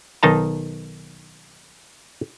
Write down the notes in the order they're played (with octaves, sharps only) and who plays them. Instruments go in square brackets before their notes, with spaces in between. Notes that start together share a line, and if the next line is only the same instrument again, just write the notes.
[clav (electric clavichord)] B1 D#3 D#4 A5 A#5